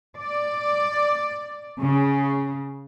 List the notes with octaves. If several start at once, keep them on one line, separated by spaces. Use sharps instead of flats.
D5
C#3